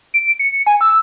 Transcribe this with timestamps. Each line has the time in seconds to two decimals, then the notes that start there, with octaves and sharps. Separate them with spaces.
0.14 D7
0.39 C#7
0.67 G#5
0.81 E6